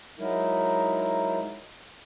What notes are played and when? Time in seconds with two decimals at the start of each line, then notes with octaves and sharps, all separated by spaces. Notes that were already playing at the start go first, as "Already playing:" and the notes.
0.19 F#3 G#3 D#4 E4 A#4